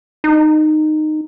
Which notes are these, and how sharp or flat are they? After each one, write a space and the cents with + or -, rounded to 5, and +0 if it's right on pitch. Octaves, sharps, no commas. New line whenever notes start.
D#4 -15